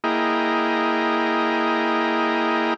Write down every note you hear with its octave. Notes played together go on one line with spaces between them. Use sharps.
A#3 E4 G#4 D#5 G5 A#5